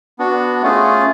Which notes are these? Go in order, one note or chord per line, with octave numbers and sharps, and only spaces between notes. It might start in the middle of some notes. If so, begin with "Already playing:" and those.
B3 D4 F#4
A3 C#4 F4 G#4